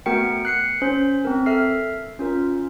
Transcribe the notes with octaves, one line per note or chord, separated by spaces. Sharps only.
A3 B3 F#4 A#4 G5 C#7
F#6 C7 C#7
C#4 C5
C4 A#4
A4 E5 F6 C7
C#4 F4 A#4